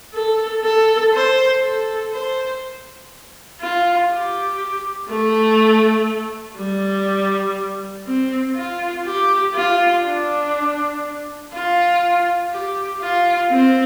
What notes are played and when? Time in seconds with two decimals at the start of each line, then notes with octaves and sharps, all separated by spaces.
0.14 A4
0.64 A4
1.13 C5
1.63 A4
2.13 C5
3.61 F4
4.11 G4
5.09 A3
6.57 G3
8.07 C4
8.55 F4
9.05 G4
9.55 F4
10.04 D4
11.53 F4
12.52 G4
13.01 F4
13.50 C4